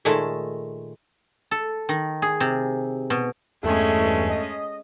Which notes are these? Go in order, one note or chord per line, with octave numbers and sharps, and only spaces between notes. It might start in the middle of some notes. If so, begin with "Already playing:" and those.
A#2 D#3 G#3 A3 A4
A4
D#3
G#4
C3
B2
E2 G2 G#3 A3 C#4 G#4
D#5